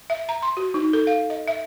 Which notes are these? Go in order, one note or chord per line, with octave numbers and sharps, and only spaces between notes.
E5
A#5
C6
F#4
D#4
A4
F5
D#5
E5